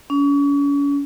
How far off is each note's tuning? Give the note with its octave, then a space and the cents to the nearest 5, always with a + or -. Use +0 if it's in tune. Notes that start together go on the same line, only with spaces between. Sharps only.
C#4 +40